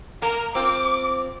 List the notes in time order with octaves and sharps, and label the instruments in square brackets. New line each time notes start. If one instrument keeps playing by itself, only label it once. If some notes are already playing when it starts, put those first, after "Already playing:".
[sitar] A#3 [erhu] A#4
[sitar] C4 F4 [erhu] D6